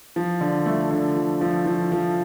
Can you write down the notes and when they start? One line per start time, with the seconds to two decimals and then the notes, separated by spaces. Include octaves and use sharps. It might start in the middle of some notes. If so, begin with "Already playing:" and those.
0.16 F3
0.41 D3
0.66 A3
0.91 D3
1.16 F3
1.41 F3
1.66 F3
1.92 F3